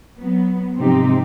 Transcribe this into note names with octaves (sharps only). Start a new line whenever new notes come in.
F#3 B3
G#2 C3 F3 C4 D#4 G4